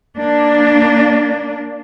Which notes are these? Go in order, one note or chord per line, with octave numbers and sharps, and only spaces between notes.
A#3 D4